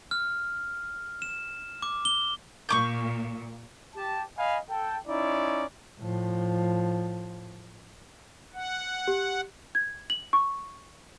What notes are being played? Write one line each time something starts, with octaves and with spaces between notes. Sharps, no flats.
F6
E7
D6
G7
A#2 C#6 D6 G6
G4 A5
D#5 F5 G#5 B5
A4 G5
C#4 D#4 E4 D5
A2 F3
F#5
G4
G#6
F#7
C#6